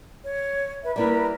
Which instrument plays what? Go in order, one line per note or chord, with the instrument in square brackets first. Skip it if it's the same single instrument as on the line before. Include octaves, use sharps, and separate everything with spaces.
[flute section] C#5
B4 E5
[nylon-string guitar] G3 A#3 E4 [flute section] A#4 B4 A#5